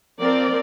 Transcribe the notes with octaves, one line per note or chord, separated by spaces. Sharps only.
F3 C4 A#4 D5